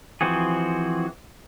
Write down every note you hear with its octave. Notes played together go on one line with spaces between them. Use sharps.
E3 F3 C4 F#4 G#4